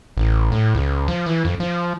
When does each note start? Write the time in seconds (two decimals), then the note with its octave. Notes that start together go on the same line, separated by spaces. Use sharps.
0.17 A1
0.52 A2
0.75 C#2
1.08 F3
1.26 E3
1.45 F2
1.60 F3